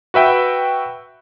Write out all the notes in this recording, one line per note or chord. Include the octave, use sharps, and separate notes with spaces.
F#4 B4 E5 G5